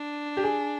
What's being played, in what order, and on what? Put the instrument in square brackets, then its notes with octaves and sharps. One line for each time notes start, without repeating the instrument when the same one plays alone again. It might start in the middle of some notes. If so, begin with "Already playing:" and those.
Already playing: [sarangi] D4
[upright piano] G4
G#4